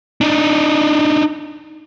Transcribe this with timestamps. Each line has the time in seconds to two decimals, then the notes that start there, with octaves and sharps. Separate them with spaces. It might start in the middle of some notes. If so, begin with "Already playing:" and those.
0.21 D4 D#4